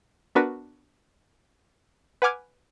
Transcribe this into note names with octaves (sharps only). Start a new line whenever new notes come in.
B3 D4 F#4 A#4 B4
B4 F#5 G#5 D6 F6 G#6